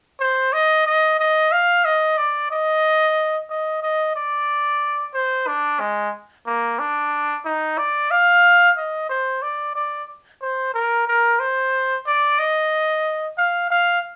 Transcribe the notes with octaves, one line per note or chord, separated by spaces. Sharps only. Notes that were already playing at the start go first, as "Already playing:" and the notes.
C5
D#5
D#5
D#5
F5
D#5
D5
D#5
D#5
D#5
D5
C5
D4
G#3
A#3
D4
D#4
D5
F5
D#5
C5
D5
D5
C5
A#4
A#4
C5
D5
D#5
F5
F5